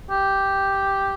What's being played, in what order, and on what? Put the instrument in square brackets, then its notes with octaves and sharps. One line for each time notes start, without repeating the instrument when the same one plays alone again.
[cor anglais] G4